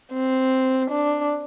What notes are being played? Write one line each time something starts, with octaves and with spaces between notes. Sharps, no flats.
C4
D4